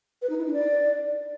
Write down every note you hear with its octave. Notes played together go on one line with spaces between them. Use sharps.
B4
D#4
E4
D4
D5